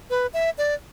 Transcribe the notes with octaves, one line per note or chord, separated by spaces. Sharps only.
B4
E5
D5